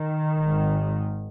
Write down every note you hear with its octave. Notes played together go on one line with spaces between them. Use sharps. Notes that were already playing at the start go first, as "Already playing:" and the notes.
Already playing: D#3
G#1 G#2